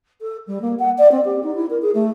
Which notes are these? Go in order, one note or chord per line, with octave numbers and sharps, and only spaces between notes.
A4
G3
A#3
F#5
D5
C4
G4
D#4
E4
A#4
G#4
A3